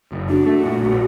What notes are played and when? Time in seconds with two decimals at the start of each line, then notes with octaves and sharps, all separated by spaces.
0.12 F#1
0.29 D4 F#4
0.46 A3
0.64 A#2
0.81 A#1